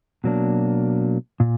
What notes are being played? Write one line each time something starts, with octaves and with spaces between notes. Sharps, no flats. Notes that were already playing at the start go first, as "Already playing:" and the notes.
B2 F#3 A#3 D4
A#2